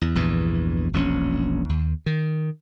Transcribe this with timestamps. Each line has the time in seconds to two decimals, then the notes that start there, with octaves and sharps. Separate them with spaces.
0.01 E2
0.15 A#1 E2 G2 E3
0.93 E1 A#1 C4 C#4
1.69 D#2
2.06 D#3